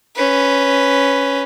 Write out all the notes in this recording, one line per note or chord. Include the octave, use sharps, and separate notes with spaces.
C#4 B4